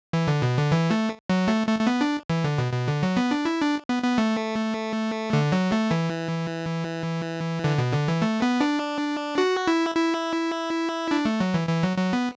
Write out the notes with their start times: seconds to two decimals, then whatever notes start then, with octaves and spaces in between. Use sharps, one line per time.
0.13 E3
0.27 D3
0.42 B2
0.57 D3
0.72 E3
0.91 A3
1.30 F#3
1.48 A3
1.67 A3
1.79 A3
1.87 B3
2.01 D4
2.30 E3
2.44 D3
2.58 B2
2.73 B2
2.88 D3
3.03 F#3
3.17 B3
3.31 D4
3.45 E4
3.61 D4
3.89 B3
4.03 B3
4.18 A3
5.33 D3
5.52 F#3
5.72 A3
5.91 E3
7.64 D3
7.78 B2
7.93 D3
8.08 E3
8.22 A3
8.42 B3
8.61 D4
9.38 F#4
9.67 E4
9.95 E4
11.11 D4
11.25 A3
11.40 F#3
11.54 E3
11.69 E3
11.83 F#3
11.97 F#3
12.13 B3